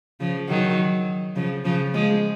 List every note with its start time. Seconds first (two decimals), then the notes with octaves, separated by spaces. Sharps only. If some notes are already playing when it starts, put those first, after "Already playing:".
0.20 C#3 F3
0.49 D#3 F#3
1.36 C#3 F3
1.65 C#3 F3
1.94 F3 G#3